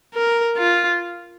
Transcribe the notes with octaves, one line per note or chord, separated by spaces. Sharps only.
A#4
F4